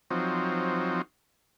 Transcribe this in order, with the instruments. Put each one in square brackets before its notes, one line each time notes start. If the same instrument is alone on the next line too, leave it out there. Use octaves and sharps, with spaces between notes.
[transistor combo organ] F3 F#3 C4 D#4